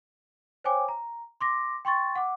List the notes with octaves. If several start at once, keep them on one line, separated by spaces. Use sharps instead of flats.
C5 C#5 G5 G#5 D6
A#5
C6 D6 A#6
G5 C6 C#6 A6
F#5 D6